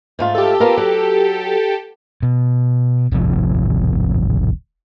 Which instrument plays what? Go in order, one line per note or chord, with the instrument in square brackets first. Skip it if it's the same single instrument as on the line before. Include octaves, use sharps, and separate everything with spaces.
[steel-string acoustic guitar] G#2 A3 F4
[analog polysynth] G4 A4
[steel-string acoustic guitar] B3 F4 A#4
F#3
[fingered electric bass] B2
D1 G#1 C3 F3